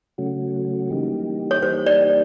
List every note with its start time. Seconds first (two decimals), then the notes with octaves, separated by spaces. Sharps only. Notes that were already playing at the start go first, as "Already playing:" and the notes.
0.18 C#3 F#3 A3 C#4 F#4
0.91 E3 G3 A#3 D#4 G4
1.51 C#5
1.63 E3 G3 A#3 D#4 G4 C5
1.86 D5